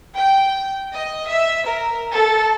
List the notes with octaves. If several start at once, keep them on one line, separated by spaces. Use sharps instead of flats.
G5
D#5
E5
A#4
A4